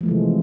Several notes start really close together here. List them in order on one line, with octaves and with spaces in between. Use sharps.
F3 A3 E3 G#3 C3